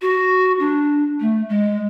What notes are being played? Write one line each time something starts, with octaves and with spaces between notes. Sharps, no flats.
F#4
D4
A3
G#3